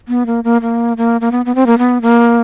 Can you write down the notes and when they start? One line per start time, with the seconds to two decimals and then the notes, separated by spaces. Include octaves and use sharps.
0.08 B3
0.26 A#3
0.44 A#3
0.62 A#3
0.97 A#3
1.21 A#3
1.32 B3
1.46 B3
1.55 C4
1.67 A#3
1.78 B3
2.02 A#3